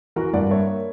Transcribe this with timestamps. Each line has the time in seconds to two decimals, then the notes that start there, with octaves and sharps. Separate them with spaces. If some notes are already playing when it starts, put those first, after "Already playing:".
0.16 E3 F#4 A#4
0.33 G2 D5 F#5
0.51 A#3 C#5 E5